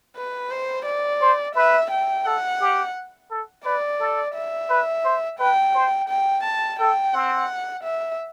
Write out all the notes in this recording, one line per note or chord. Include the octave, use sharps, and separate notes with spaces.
B4
C5
D5
C5
B4 E5
G5
A4 F#5
G4
A4
B4 D5
A4
E5
B4
C5
B4 G5
C5
G5
A5
A4 G5
C4 F#5
E5